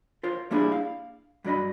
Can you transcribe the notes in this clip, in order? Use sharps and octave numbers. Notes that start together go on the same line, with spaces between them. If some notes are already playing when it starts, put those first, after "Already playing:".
F4 A#4 C5 C#5
G3 A#3 D4 E4 G#4
F5
G2 F#3 D4 D#5 B5